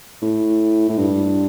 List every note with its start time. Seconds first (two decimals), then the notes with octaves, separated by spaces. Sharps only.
0.22 A2
0.89 A2
0.98 G2